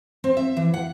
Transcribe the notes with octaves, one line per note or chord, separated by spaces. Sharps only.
C4
E5
E3
F#5